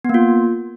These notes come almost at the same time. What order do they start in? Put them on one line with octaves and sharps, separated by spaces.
B3 A#3 F4